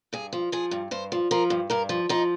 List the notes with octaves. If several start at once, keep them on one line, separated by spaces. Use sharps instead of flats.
G2 G#4
F3
F3 G#4
G2
G2 C5
F3
F3 A#4
G2
G2 A#4
F3
F3 D#4